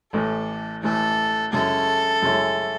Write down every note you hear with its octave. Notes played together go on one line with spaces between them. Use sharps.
A1 A2 E3 A4
A1 A2 E3 A4
F#2 C#3 G#3 C#4 E4 A4
F#2 C#3 G#3 C#4 E4